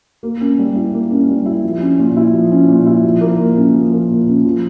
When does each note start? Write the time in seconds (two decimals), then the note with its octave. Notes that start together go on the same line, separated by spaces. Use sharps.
0.23 A#3
0.41 C#4
0.59 G3
0.75 E4
0.94 A#3
1.11 C#4
1.29 G3
1.46 E4
1.64 F3
1.81 C#4
1.99 A#2
2.16 E4
2.34 F3
2.51 C#4
2.68 A#2
2.86 E4
3.04 F3
3.21 A#3
3.39 A#2
3.56 C#4
3.74 F3
3.92 A#3
4.10 A#2
4.28 C#4
4.45 F3